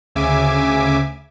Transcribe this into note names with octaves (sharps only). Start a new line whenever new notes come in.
D2 C#3 E5 G#5 D6